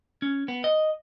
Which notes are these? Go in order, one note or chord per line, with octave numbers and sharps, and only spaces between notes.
C#4
B3
D#5